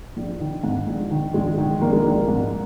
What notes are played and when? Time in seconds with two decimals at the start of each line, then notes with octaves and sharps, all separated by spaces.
0.16 A#1
0.40 D#3
0.64 G#2
0.87 A#1
1.11 D#3
1.34 A#1 G#3
1.58 D#3
1.81 A#1 A#3
1.92 G#3
2.03 A#1 A#3
2.28 G#2